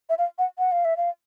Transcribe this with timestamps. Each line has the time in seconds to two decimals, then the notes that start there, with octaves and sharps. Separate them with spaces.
0.09 E5
0.18 F5
0.38 F#5
0.58 F#5
0.72 F5
0.85 E5
0.97 F5